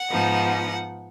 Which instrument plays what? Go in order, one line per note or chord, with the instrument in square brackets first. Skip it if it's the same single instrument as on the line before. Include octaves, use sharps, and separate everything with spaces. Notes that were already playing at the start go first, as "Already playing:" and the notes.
Already playing: [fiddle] F#5
[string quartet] G#2 F3 B3 D#4